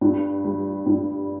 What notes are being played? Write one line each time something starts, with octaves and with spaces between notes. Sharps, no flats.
G2
G3
G2